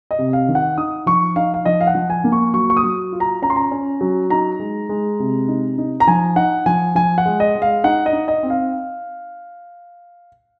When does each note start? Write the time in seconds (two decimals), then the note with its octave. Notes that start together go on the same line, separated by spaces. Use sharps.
0.11 D#5
0.19 C3
0.33 F5
0.48 D#3
0.55 F#5
0.78 D#4 D#6
1.06 F3 C#6
1.36 D#4 F5
1.54 F5
1.65 F3 D#5
1.81 F5
1.87 F#5
1.95 F3
2.10 G#5
2.24 A#3
2.32 C#6
2.54 F#3 C#6
2.70 C#6
2.77 D#6
2.83 F#3
3.12 F4
3.20 A#5
3.42 C#4 A#5
3.50 C6
3.56 A#5
3.71 C#4
4.01 F#3
4.30 D#4 A#5
4.59 G#3
4.89 G#3
5.19 C3
5.48 D#4
5.78 D#4
6.00 A#5
6.07 F3 G#5
6.36 D#4 F#5
6.66 F3 G#5
6.95 F3 G#5
7.18 F#5
7.26 G#3
7.40 D#5
7.55 G#3
7.62 F5
7.84 D#4 F#5
8.06 D#5
8.13 D#4
8.28 D#5
8.43 C4
8.50 F5